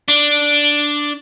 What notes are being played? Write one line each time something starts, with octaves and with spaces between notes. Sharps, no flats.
D4